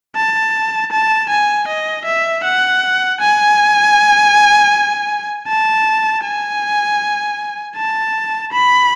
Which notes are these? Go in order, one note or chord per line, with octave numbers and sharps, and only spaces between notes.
A5
A5
G#5
D#5
E5
F#5
G#5
A5
G#5
A5
B5